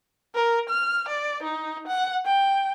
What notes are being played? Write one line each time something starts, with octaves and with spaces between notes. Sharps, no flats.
A#4
F6
D5
D#4
F#5
G5